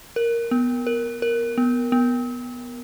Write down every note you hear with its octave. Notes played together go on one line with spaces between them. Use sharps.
A#4
B3
A#4
A#4
B3
B3